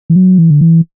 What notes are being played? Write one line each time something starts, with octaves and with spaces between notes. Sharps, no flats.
E3
F#3
E3
D3
E3